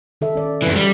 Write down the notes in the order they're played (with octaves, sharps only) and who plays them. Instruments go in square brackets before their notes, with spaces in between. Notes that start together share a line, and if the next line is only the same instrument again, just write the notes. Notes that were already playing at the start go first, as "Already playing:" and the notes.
[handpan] D#3 A4 E5
C#4 D5
[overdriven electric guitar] F#2 E3
G3